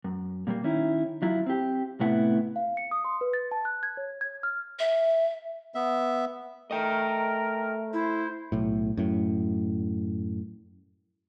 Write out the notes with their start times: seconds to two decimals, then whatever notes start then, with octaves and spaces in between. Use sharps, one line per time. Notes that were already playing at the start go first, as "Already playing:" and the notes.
0.04 F#2
0.47 A#2 G3 A3 A#3
0.64 D#3 C#4 E4
1.22 F#3 E4 F4
1.47 C4 G4
2.00 A2 C3 A3 B3 E4 F#5
2.56 F5
2.77 C#7
2.91 D#6
3.05 C6
3.21 B4
3.34 A6
3.51 A5
3.65 F#6
3.83 G#6
3.97 C#5
4.21 G#6
4.43 F6
4.79 E5
5.75 B3 E5
6.71 A3 A#4 D#5 G5
7.93 E4 C5
8.52 B1 A2
8.97 F#2 A2